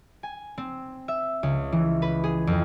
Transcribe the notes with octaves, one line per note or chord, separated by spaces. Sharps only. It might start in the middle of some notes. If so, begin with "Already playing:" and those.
G#5
C4
E5
C#2
E3
B4
G#4
F2